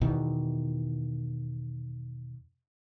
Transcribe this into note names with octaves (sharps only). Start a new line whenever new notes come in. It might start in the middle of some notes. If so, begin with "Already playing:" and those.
E2 B2 D#3 E3